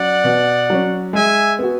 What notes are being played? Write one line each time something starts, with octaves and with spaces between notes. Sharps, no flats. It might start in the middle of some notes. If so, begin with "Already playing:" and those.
Already playing: F#3 C#4 D5 F#5
B2
F#3 C#4
G#3 E5 G#5
B3 F#4